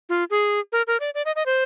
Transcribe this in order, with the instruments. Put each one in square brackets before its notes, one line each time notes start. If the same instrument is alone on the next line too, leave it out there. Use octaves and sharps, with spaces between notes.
[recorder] F4
G#4
A#4
A#4
D5
D5
D#5
D#5
C5